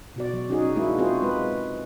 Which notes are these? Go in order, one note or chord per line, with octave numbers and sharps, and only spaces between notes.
B2 F#4 D5
F#3
C#4 D#4 F#4 G#4
G#3 A#3 D4 E4 F#4
C4 F4 F#4 G#4 C5
G#3 B4